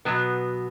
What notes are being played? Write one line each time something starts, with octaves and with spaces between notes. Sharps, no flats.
B2 F#3 B3